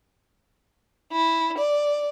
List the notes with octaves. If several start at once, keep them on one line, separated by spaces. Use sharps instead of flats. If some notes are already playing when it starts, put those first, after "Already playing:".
E4
D5